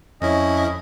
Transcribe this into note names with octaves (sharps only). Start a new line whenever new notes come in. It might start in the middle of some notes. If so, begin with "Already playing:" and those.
F2 C#4 E4 D#5